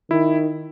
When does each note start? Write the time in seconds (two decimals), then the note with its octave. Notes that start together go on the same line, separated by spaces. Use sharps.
0.10 D#3 E4